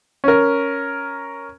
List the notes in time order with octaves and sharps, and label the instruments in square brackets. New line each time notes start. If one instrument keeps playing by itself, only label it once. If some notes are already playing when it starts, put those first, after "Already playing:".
[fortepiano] C#4 A#4